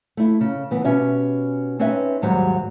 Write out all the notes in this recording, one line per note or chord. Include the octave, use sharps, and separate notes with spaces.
A3 E4
C#3
E3 B3
B2 C#4 G4 E5
C4 C#4 D#4 B4 E5
D#2 G#2 F#3 G3 C5